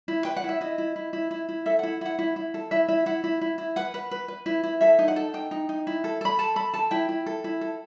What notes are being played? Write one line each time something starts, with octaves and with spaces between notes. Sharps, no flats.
E4
B4 G5
F#5
E4
E5
E4 D#5
E4
E4
E4
E4
E4
A4 E5
E4 F#5
E4 F#5
E4
E4
A4
E4 E5
E4 E5
E4 F#5
E4
E4
E4
B4 F#5
B4
B4
B4
E4
E4
A4 E5
D#4
F#5
A4
D#4 G5
D#4
D#4
E4
A4
A4 B5
A4 A5
A4 B5
A4 A5
E4 G5
E4
A4
E4
A4